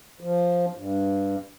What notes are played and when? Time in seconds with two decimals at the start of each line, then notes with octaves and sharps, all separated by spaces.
0.21 F3
0.75 G2